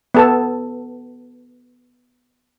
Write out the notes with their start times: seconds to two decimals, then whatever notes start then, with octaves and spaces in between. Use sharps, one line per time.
0.15 B3 A4 A5